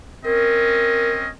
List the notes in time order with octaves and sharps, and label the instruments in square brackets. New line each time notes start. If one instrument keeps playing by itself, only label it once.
[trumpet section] C4 C#4 D#5 [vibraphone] A#4